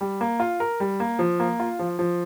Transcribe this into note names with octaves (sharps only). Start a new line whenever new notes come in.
G3
A#3
F4
A#4
G3
A#3
F3
A#3
F4
F3
F3